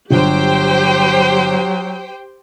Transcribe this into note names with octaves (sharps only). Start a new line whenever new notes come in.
G1 F#3 G4 C5 G5